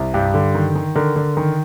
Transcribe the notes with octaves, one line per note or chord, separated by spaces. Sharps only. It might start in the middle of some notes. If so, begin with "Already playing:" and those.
Already playing: C2
G2 G4
D3
D#3
D#3
D3 A#4
D3
D#3